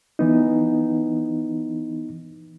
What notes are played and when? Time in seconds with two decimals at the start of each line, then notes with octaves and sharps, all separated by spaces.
0.19 E3 B3 D#4